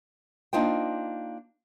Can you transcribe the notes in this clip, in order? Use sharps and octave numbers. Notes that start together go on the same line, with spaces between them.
A#3 D4 D#4 F4 C5 G5